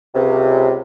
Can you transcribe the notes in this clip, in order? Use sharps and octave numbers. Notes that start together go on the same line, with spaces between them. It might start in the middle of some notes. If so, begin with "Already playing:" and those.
C#2 C3